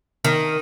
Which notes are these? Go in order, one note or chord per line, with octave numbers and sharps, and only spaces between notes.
D#3